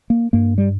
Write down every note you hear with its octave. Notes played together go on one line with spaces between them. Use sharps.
A#3
G2 A#3
G3